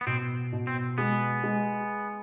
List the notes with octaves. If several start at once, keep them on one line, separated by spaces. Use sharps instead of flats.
B3
B2 C4
B2
C4
G#3 B3
G#3